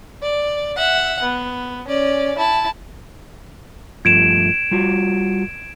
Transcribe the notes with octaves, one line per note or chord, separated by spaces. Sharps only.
D5
E5 F#5
B3
C#4 D5
E4 A5
G2 F3 A3 G#6 D7 E7
G3 F4 F#4